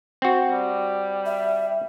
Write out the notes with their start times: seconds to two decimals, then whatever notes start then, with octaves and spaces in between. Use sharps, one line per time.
0.22 C4 F#4
0.51 G3
1.26 E5